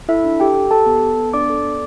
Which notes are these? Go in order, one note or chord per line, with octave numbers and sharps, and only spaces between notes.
E4 A4 E5
D4
G4 A4 G5
A4
G4 A4 A5
B3
B3
B3
D4 D5 D6
A4
B3